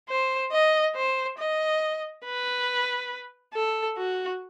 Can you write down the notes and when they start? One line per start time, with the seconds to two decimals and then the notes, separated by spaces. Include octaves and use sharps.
0.09 C5
0.52 D#5
0.96 C5
1.38 D#5
2.25 B4
3.54 A4
3.97 F#4